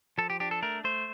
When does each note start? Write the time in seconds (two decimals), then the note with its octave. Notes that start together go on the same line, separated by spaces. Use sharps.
0.18 F3 A4
0.30 G4
0.40 D4 G4
0.51 A4
0.62 A3 A#4
0.84 A3 C5